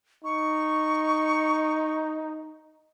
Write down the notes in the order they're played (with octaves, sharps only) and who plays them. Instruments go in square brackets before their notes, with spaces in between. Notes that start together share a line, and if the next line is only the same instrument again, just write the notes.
[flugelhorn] D#4 [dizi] C#6